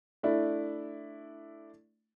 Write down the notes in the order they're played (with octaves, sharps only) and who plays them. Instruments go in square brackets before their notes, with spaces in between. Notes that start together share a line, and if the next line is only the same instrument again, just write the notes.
[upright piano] A3 D4 E4